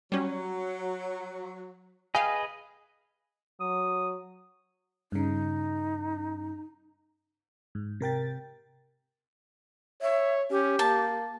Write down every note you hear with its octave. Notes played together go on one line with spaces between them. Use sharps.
F#3 G3 C#4
G#4 B4 D#5 F5 G5 G#5
F#3 D#6
G2 C#3 D#4
G#2
C3 A#4 G5 A6
C#5 E5
C#4 G4
A#3 A5